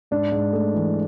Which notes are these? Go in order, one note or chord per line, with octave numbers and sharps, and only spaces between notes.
G#2 D4
G#2
A3
E3